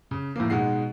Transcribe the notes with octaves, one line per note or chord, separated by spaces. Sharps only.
C#3
A2 F3 A#3
G#2 B2 G#3 F#5 C7